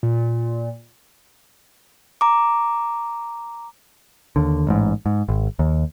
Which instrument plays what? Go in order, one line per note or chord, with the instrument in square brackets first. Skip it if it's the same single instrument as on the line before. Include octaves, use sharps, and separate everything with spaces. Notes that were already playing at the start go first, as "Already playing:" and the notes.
[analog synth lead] A#2
[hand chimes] A#5 D6
[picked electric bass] D#2 D3
A1 G#2
G#2
G#1
D#2